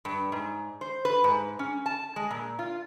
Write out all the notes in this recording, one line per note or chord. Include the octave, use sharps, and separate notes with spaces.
G2
G#2
C5
B4
G#2
C#4
A5
G#3
A#2
F4